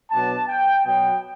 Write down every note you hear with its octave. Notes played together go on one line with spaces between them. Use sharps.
B2 F#3 B3 D4 A5
G5
B2 F#3 B3 G5